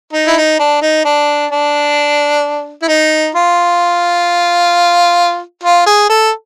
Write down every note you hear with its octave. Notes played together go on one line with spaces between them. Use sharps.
D#4
E4
D#4
D4
D#4
D4
D4
E4
D#4
F4
F4
G#4
A4